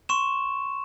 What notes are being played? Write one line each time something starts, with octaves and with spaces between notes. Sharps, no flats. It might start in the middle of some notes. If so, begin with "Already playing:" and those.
C6 C#6 E7